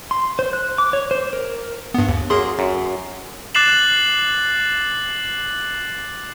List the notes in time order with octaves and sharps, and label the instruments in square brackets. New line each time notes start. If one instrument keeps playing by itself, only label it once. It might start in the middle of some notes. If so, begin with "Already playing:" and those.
[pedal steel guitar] C6
C5
F#6
D6
C#5
C5
A#4
[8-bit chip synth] G2 B3
D#2
[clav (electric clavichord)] F#2 A#3 [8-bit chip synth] G#4 C6
[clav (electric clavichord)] F#2
[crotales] D6 F#6 A6 C7 E7 F#7